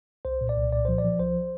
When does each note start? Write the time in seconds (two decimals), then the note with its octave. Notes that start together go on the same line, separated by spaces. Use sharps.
0.25 C2 C5
0.41 A#2
0.49 D5
0.57 C2
0.72 A#2 D5
0.85 F3 C5
0.98 D5
1.04 F3
1.19 C2 C5